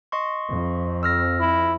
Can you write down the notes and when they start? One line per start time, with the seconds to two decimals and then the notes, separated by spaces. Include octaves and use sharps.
0.12 D#5 C6 C#6
0.48 F2
1.03 E6 F6 A#6
1.40 E4